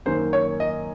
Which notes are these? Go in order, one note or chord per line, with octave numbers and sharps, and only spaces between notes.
F#2 D#3 A#3 C5
C#5
D#5